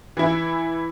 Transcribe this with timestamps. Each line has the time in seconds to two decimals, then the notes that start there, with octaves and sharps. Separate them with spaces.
0.17 E3 E4